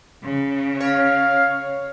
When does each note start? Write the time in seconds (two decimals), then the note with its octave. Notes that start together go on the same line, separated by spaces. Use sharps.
0.23 C#3
0.80 C#5 F5